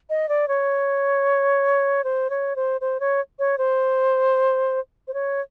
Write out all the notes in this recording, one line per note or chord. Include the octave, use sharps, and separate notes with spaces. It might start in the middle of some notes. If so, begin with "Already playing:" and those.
D#5
D5
C#5
C5
C#5
C5
C5
C#5
C#5
C5
C5
C#5